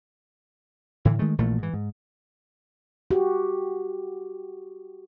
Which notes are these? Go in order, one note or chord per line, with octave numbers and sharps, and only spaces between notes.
A2 D3 E3
D#3 G#3 A3
A#1 A#2 E3 A3
G#2 E3
G#2
F#4 G4